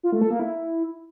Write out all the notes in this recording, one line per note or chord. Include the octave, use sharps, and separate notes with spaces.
F4
A3
A4
A#3
E4